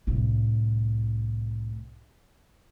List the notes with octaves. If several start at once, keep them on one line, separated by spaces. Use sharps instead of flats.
C2 A2